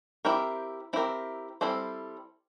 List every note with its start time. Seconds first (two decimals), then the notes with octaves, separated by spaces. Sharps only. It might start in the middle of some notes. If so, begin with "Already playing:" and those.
0.25 C4 E4 G4 A#4
0.93 C4 E4 G4 A#4
1.61 G3 C4 E4 A4 C5